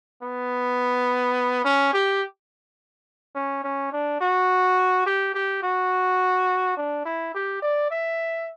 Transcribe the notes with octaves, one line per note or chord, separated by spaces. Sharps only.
B3
C#4
G4
C#4
C#4
D4
F#4
G4
G4
F#4
D4
E4
G4
D5
E5